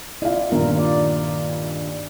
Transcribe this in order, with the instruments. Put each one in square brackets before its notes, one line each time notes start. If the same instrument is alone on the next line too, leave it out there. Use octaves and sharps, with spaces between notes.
[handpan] E4 F4 [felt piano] D5 F5
[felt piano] G2 A#2 D#3 [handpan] A#4
[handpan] D5